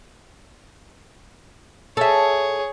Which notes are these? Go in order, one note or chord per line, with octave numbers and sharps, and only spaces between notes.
G#4 A4 C#5 E5